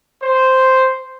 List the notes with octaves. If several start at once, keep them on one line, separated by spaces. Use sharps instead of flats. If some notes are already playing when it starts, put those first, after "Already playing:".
C5